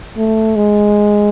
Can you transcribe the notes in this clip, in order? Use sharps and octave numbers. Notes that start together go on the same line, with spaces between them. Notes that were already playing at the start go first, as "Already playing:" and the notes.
A3
G#3